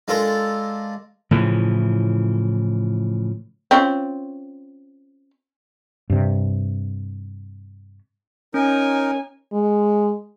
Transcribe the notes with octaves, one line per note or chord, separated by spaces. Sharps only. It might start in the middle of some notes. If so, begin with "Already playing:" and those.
G#3 D4 F4 A4 A#4
A2 C#3 E3 F3
C4 C#4 F4
G2 C3
C#4 D#4 A#4 C#5 G#5
G#3